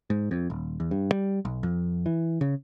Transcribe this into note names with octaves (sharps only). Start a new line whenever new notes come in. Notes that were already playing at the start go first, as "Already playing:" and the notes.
G#2
F2
D#1
E2
G2
G3
B1
F2
E3
C#3